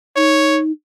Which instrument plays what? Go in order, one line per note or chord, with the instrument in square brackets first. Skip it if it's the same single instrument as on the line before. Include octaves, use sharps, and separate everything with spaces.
[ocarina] D#4 [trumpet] C#5